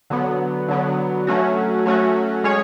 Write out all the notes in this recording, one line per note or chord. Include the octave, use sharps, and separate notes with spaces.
D3 F#3 B3
D3 F#3 B3
F#3 A3 C#4 F#4
F#3 A3 C#4 F#4
G#3 C#4 G#4 C#5